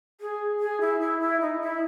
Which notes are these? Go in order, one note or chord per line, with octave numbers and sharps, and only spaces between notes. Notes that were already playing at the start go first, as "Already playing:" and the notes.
G#4
G#4
E4
E4
E4
D#4
E4